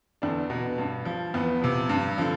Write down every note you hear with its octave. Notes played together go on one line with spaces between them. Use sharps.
E2 D3 D4
B2
G2
F3
E2 B3
C3 F3
G2
D3 F3